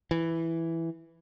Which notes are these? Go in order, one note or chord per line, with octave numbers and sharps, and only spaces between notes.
E3